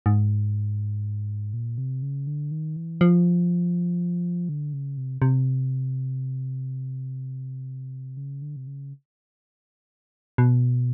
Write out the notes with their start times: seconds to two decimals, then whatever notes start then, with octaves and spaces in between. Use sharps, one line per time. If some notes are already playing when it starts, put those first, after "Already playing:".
0.06 G#2
1.53 A#2
1.78 C3
2.02 C#3
2.27 D3
2.51 D#3
2.76 E3
3.01 F3
4.49 D3
4.73 C#3
4.97 C3
5.22 C3
8.17 C#3
8.42 D3
8.56 C3
8.67 C#3
10.38 B2